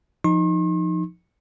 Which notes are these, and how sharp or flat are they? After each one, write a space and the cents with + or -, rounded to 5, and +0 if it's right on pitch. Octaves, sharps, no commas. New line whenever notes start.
F3 +0 D#4 +0 C6 +45